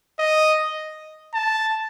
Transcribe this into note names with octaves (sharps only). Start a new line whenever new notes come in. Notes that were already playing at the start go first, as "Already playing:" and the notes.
D#5
A5